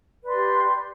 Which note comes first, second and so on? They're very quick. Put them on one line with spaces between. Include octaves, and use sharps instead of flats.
B4 D5 C6 G4